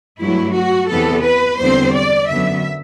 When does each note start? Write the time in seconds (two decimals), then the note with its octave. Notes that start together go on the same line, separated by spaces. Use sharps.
0.21 G2 F#3 A3 E4
0.56 F#4
0.90 E2 C3 E3 B3 A4
1.25 B4
1.60 E2 D3 G3 C4 C5
1.95 D5
2.30 F#2 D3 F#3 B3 E5